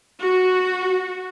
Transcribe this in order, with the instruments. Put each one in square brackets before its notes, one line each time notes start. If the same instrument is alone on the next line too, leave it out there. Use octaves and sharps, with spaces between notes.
[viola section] F#4